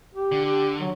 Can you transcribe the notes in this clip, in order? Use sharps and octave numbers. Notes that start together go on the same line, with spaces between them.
G4
D3
G4
F#3